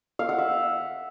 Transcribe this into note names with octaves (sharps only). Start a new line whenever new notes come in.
F5
F#5
E5